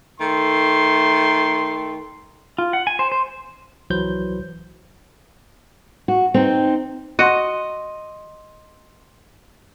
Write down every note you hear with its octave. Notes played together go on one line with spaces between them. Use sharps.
D#3 A3 C6
F4
F#5
G#5
C5
C5
C2 E3 F#3 B4 C5 G6
F#4
C4 D#4
F#4 D#5 C6 D#7